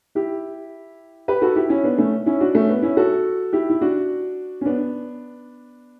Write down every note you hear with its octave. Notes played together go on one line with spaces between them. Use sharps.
E4 G4
G4 B4
F#4 A4
E4 G4
C#4 E4
B3 D4
A3 C#4
C#4 E4
D4 F#4
A3 C#4
B3 D4
C#4 E4
F#4 A4
E4 G4
E4
D4 F#4
C#4
B3 D4